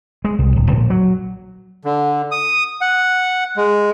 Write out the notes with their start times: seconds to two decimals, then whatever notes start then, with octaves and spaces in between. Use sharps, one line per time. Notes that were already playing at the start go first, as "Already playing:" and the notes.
0.25 G#3
0.39 C2
0.56 D1
0.71 A#1
0.90 F#3
1.85 D3
2.32 D#6
2.81 F#5
3.57 G#3